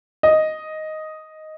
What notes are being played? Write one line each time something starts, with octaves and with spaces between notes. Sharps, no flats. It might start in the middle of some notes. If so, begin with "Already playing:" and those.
D#5